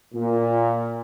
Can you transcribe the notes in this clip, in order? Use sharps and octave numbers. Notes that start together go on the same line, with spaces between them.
A#2